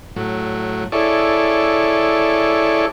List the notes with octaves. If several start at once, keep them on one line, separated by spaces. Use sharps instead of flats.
A2 F#3
E4 G#4 A4 C#5 D5